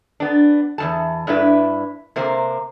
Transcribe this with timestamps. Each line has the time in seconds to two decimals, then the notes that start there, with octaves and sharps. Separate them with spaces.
0.20 B3 D4
0.78 E2 G2 A5
1.27 G2 D4 E4 B4
2.16 C3 A#3 C5